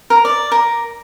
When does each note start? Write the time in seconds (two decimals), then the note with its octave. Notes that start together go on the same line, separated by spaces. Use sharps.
0.10 A#4
0.25 D5
0.52 A#4